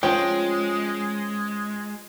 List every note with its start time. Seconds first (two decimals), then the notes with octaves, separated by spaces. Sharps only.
0.03 F3 G#3 C#4 C#5 G5